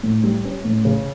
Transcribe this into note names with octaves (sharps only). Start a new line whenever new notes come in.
A2
G3
C#4
A2
C#3